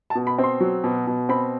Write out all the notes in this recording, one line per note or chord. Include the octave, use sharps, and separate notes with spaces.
A5
B2
B5
C4
C6
F#3
B2
B2
C4 B5